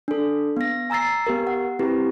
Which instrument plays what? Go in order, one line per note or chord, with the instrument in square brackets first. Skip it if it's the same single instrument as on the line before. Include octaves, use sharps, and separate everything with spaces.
[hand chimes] D4 A4
B3 A#6
G#5 A#5 E6 A6 C7
B3 G4 A#4
F#5
C4 E4 G4 B4